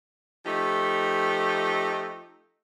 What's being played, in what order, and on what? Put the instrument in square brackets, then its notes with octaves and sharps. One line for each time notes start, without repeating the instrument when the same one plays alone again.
[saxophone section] F3 A3 D#4 G4